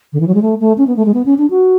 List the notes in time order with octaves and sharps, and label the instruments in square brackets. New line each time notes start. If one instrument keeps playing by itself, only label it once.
[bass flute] D3
E3
F#3
G#3
A3
A3
C#4
B3
A3
G#3
B3
C#4
D4
F#4